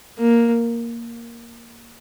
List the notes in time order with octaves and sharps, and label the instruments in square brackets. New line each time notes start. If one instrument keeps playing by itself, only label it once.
[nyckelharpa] A#3